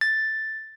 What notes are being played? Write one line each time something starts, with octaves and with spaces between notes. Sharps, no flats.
A6